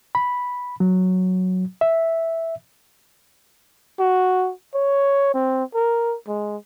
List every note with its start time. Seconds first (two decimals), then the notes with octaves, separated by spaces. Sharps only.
0.15 B5
0.80 F#3
1.81 E5
3.99 F#4
4.74 C#5
5.34 C4
5.75 A#4
6.27 G#3